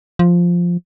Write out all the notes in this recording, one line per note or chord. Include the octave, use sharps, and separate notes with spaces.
F3